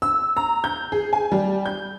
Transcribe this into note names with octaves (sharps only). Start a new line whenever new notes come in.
E6
A#5
G6
G#4
G#5
G3
G6